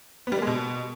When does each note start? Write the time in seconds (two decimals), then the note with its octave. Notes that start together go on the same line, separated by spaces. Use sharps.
0.27 B3
0.32 G3
0.37 A#3
0.42 G#3
0.47 B2